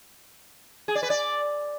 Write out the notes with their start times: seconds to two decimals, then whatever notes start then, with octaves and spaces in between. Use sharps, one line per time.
0.88 G#4
0.95 D5
1.03 B4
1.10 D5